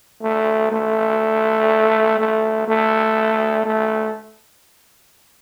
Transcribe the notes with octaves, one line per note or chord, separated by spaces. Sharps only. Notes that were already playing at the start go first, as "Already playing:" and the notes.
A3
A3
A3
A3
A3